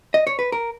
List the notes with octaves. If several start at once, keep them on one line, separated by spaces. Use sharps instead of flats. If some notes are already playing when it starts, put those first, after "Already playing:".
D#5
C#5
B4
A#4